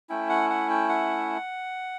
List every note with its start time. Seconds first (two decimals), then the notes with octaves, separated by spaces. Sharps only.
0.09 A3 C#4 E4 G5
0.29 F#5
0.50 F#5
0.70 G5
0.89 F#5